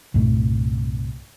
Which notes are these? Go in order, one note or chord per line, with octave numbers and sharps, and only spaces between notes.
C2 G2 A#2 A3